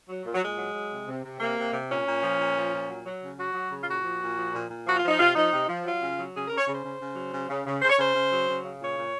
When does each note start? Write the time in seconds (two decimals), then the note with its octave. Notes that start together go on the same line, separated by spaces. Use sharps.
0.08 F#3
0.25 A#2
0.34 F#3
0.42 A#2 G#3
0.58 F#3
0.74 F#3
0.91 C3
1.07 C3
1.23 C3
1.40 C3 A#3
1.57 C3
1.73 C3
1.89 A#2 C#4
2.07 A#2
2.23 F3
2.39 A#2
2.56 F3
2.72 A#2
2.88 F#3
3.05 F#3
3.22 C#3
3.38 F#3 F#4
3.53 F#3
3.71 C#3
3.83 F4
3.87 A#2 F#4
4.03 F3
4.20 A#2
4.36 F3
4.53 A#2
4.69 A#2
4.86 F3 F#4
4.96 F4
5.02 F3
5.07 D#4
5.18 C3 F4
5.35 F3 D#4
5.52 C3
5.68 F3
5.84 F#3 F4
6.01 C#3
6.17 F#3
6.34 C#3 G#4
6.46 C#3 A#4
6.58 C#5
6.66 C#3 C5
6.83 C#3
7.00 C#3
7.16 F#3
7.32 C#3
7.49 C#3
7.65 C#3
7.81 C#3 C5
7.90 C#5
7.98 C#3 C5
8.14 C#3
8.31 F#3
8.47 C#3
8.64 C#3
8.80 A#2 C#5
8.96 A#2